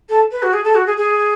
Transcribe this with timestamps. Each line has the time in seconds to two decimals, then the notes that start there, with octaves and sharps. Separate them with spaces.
0.09 A4
0.31 B4
0.42 F#4
0.53 G#4
0.63 A4
0.74 F#4
0.86 G#4
0.97 G#4